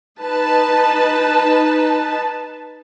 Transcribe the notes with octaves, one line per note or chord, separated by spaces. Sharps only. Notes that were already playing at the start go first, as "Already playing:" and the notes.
D#4 B4 A5